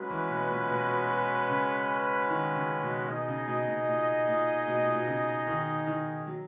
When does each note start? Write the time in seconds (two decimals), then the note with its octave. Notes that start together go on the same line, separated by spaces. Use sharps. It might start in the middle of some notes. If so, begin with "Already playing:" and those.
Already playing: F#3 G#3 C#4 F#4 B4
0.10 E3
0.30 B2
0.49 A#2
0.70 B2
1.49 C#3
2.29 D#3
2.55 C#3
2.81 B2
3.08 B2 D#4 G#4 D#5
3.28 C#3
3.48 B2
3.68 B2
3.87 A#2
4.27 A#2
4.67 B2
4.82 A#2
4.94 B2
5.07 C#3
5.47 D#3
5.87 D#3
6.27 F#3